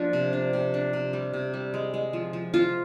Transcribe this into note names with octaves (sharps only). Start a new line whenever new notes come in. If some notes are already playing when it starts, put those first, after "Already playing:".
Already playing: F3 A#3 D4
C3
D4
C3
D4
C3
G3
C3
G3
G#3
G#3
F3
F3
F3 F4